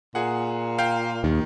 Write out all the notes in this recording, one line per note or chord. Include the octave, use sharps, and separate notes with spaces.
A#2 G#4 F#5
F5 G5 G6
D#2 D#3